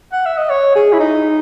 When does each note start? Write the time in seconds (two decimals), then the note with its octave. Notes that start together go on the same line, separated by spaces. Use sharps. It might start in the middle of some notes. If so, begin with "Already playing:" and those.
0.12 F#5
0.26 E5
0.37 D#5
0.50 C#5
0.75 G#4
0.93 E4
0.99 D#4